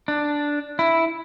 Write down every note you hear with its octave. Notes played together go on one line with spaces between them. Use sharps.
D4
E4